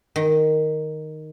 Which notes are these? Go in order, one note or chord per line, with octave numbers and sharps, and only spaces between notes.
D#3